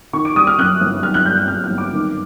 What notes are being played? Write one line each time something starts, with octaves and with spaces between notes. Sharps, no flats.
D#3 C#6
D6
G3 D#6
F6
F#2 F#6
G1
D#3 F6
F#6
G3 G6
F#6
F#2 F6
F6
G1
D6
D#3